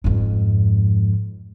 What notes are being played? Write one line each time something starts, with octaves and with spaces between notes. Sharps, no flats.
F2 G#2